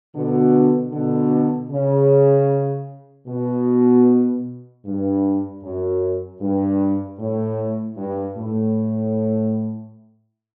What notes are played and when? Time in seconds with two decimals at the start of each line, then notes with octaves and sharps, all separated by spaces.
0.14 B2 D3
0.92 B2 D3
1.71 C#3
3.27 B2
4.84 G2
5.63 F#2
6.41 G2
7.19 A2
7.97 G2
8.37 A2